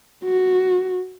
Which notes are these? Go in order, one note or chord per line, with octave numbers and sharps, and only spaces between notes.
F#4